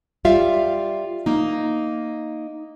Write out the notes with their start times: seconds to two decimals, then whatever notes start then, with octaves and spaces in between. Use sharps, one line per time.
0.25 G3 F4 E5 F5
1.26 A#3 D#4